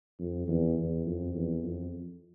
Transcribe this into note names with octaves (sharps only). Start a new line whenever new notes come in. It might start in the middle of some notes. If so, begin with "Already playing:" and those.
F2
E2
E2
F2
E2
F2